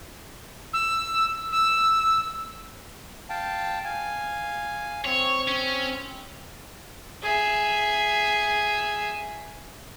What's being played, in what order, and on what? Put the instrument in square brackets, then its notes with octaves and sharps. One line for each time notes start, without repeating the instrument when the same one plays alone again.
[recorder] E6
E6
[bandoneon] F5 G5 A5
F5 G#5
[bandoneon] C4 [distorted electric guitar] C#5
[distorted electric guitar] C#4
[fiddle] G#4 E5